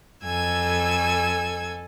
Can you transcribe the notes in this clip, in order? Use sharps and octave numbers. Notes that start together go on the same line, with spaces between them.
F2 A4 G#5 E6 G#6